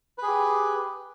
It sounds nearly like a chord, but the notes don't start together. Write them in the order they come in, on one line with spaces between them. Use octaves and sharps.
B4 G#4 G4